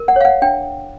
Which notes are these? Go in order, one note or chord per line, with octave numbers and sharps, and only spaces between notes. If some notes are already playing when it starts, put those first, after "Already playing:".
Already playing: A#4
F#5
C#5 F5
F#5
D4 G5